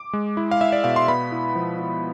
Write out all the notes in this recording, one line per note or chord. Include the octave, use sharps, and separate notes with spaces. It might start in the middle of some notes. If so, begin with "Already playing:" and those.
Already playing: D6
G#3
E4
F5
E4 E5
D5
B2 F5
C6
B3 B5
E4
F3
E4